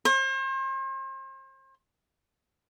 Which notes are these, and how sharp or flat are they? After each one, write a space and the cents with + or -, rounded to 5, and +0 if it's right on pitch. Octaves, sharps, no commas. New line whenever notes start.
C5 +40